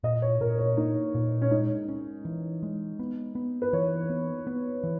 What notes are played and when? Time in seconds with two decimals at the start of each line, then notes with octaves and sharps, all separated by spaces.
0.04 A#2 D#5
0.22 C#5
0.41 A#2 A#4
0.59 C#5
0.77 A#3 D#4
1.15 A#2
1.42 C#4
1.51 G#3 D#4
1.88 C#4
2.25 E3
2.63 G#3
2.99 B3
3.35 B3
3.62 B4
3.73 E3 C#5
4.10 B3
4.47 B3
4.83 E3